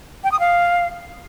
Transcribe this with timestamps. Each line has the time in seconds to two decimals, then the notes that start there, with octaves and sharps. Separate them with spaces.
0.24 G5
0.32 D#6
0.40 F5